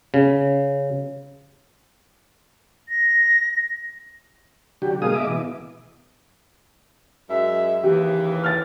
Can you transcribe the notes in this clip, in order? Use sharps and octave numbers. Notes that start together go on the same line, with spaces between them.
C#3
A#6
D3 F#3 G4
B2 G#3 A#3 G#4 F5 D#6
D#5 E5 D6
B2 E3
F#2 G#3 E5
D#2 C#3 E3 G4
F6 A6